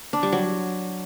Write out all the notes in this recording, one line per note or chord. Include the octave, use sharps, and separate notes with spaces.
D4
G3
F#3